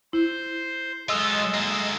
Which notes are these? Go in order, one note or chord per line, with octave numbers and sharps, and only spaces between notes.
E4 C5
F#3 G#3 F4 A4 D#5 E6
D2 A#3